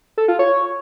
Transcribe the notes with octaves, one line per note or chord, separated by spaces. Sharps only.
A4
F4
C#5